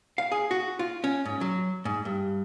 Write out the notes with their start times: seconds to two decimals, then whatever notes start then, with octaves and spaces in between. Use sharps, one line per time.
0.18 F5
0.32 G#4
0.51 F#4
0.79 F4
1.04 C#4
1.25 G#2
1.41 F#3
1.85 G#2
2.05 G2